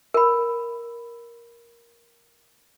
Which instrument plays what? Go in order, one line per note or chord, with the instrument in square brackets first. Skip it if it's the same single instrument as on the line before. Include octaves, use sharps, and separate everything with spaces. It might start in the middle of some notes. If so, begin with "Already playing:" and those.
[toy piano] A#4 B5